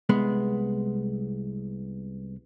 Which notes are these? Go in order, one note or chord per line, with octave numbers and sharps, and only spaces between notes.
C2 G#3 B3